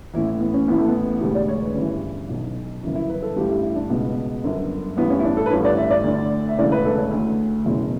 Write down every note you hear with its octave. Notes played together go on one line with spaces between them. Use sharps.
A1 A2 E3 E4
B3
C#4
A1 A2 E3 B3
A3
B3
E1 D2 D3 G4
D5
C#5
B4
G1 G2 E3 C#4
B1 B2
G1 F#2 C#3 E3
E4
B4
A4
A1 G2 E3 G4
E4
E4
D4
C#2 B2 B3
G1 F#2 D3
A1 G2 E3 B3
C#4
E4
D4
A4
B4
A1 G2 D3 C#5
D5
E5
D5
D2 D3
E5
E1 D2 C#3 E3 D5
B4
A4
C#5
D2 D3
F#1 E2 B2